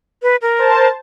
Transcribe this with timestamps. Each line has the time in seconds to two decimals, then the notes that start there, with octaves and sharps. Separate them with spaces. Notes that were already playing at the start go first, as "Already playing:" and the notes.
0.23 B4
0.42 A#4
0.59 C5 A5